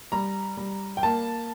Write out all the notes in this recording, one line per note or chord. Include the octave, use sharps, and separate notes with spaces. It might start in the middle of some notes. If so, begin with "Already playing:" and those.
G3 A#5
G3
G5
A#3 A5